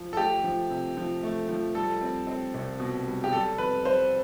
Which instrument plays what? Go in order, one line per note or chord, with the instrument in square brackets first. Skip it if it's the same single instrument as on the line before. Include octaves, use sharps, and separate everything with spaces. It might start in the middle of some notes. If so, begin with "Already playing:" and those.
Already playing: [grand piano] F3
[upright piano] A4
[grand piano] A3 [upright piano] G4
[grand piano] F3
C3
F3
A3
F3
[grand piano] G3 [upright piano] A4
[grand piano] C4
C4
C2
B2
G3
[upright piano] G4
[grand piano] G3 [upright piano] A4
[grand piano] F2 [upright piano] B4
[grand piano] G3 [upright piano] C5